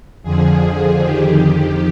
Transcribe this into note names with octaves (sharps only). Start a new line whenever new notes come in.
F2 D3 F3 G#4
F2 D#3 G4